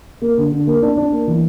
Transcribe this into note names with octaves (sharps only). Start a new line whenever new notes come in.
A#3
D3
D3
A#3
D4
D4
A#3
E3